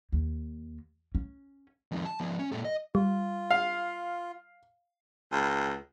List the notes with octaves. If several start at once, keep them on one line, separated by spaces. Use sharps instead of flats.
D#2
C#4
F2 D#3
A5
F3 B3
C#4
A#2 A4
D#5
G3 F4
F5
C#2